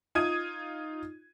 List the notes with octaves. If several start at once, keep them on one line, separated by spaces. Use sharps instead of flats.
D#4 F4 D#6 G#6 D#7